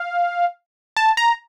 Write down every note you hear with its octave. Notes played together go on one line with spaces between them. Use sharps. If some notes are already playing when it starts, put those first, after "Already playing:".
Already playing: F5
A5
A#5